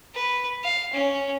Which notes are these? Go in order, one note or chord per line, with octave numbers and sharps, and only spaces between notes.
B4
F5
C#4